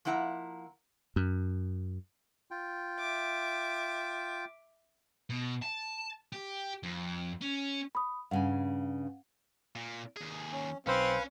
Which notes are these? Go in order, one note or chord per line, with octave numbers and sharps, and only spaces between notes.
F3 A#3 E4 F#5 A#5
F#2
F4 G5
E5 D6
B2
A5
G4
F2
C#4
B5 D#6
G2 C#3 F5 F#5 G#5
A#2
D#2 G#4
C#4
B1 C4 C#4 B4 C5 F5